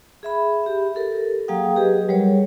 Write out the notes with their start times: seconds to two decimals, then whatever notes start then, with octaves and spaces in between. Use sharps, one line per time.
0.23 G#4 E5 B5
0.63 G4 E5
0.95 G4 A4 A#4
1.48 F#3 A#3 G#4 F5 G5 D#6
1.76 G4 G#4 B4 D#5
2.09 F#3 G3 G#4 A#4 C#5